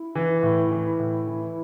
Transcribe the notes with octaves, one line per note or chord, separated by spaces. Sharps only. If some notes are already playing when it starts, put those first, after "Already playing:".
Already playing: E4
E3
A2
E3
A2
E3